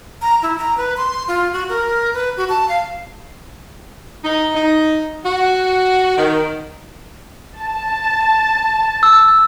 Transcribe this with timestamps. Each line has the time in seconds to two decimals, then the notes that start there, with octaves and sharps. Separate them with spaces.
0.22 A#5
0.43 E4
0.58 A#5
0.77 B4
0.97 C6
1.28 F4
1.53 F#4
1.69 A#4
2.14 B4
2.37 F#4
2.49 A5
2.69 F5
4.24 D#4
4.55 D#4
5.25 F#4
6.17 D#3
7.60 A5
9.03 E6